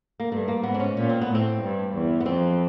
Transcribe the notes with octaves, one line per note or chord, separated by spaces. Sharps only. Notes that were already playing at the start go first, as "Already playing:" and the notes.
A#3
G2 A3
A#3
G#2 B3
D4
C#4
A#2 C#4
C4
B3
A2
C4
G2
E2
B3
F2 C4